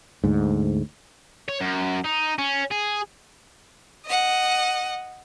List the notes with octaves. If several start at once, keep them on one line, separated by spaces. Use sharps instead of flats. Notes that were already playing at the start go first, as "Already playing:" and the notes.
D2 G#2
C#5
F#2
D#4
C#4
G#4
D#5 F#5